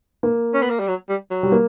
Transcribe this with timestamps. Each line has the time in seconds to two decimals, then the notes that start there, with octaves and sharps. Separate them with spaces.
0.23 A#3
0.54 C#4
0.62 B3
0.70 A#3
0.79 G3
0.88 F#3
1.09 G3
1.30 F#3
1.43 G3
1.52 A#3